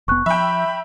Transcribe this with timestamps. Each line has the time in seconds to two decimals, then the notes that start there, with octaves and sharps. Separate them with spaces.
0.08 F1 B3 C#6 F#6
0.26 F3 E5 G5 B5